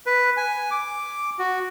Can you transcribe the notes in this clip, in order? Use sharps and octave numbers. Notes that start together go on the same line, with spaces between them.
B4
G#5
D6
F#4